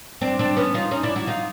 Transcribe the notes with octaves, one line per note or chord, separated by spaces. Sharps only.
C4 D4
C4 D4
B3 C#4
D#4 F4
C#4 D#4
D4 E4
E4 F#4
D#4 F4